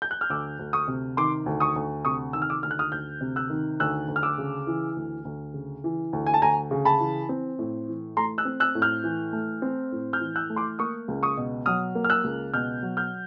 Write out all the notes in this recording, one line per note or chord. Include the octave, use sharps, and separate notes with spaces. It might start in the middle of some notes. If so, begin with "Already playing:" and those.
G6
F#6
F6
D2 D6 E6
D2
C#6 D#6
C3
D#3 C6 D6
D2
C#6 D#6
D2
C3 C#6 D#6
D#3 E6
F6
D6 E6
D2 F6
F#6
D#6 F6
D2 F6 G6
C3
E6 F#6
D#3
D2 E6 F#6
D2
F6
D6 E6
C#3
E3
D2
D2
C#3
E3
D2
G#5
A5
D2 G#5 A#5
C#3
A5 B5
E3
C4
A2
E3
A3 A#5 C6
E6 F#6
C4
E6 F#6
A2
F6 G6
E3
A3
C4
A2
F6 G6
E3
E6 F#6
A3
C6 D6
A#3 C#6 D#6
C#2
C#6 D#6
B2
F#3 D#6 F6
A#3
F6
E6 F#6
C#2
B2 F6 G6
F#3
F6 G6